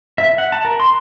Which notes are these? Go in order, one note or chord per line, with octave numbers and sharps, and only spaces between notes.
E5
F#5
A5
A#4
C6